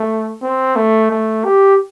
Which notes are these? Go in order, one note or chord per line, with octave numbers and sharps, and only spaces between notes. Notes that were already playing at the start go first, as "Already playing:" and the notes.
Already playing: A3
C4
A3
A3
G4